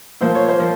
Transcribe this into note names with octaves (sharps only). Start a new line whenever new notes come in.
A#2 F3 A#3 C5
C#5
C5
F3 A#3